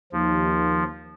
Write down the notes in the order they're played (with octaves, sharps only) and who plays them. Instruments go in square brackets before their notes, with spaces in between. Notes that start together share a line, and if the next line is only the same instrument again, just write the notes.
[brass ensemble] D#2 [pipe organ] F3